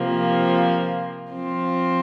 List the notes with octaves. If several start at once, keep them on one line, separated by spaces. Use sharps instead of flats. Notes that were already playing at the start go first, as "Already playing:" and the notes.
Already playing: C3 F3 A#3
F3 C4 F4